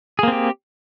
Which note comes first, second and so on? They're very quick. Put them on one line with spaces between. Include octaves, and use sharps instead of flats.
G#4 A#3 C4 G4